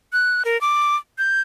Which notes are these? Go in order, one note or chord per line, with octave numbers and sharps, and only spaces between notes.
F#6
A#4
D6
G6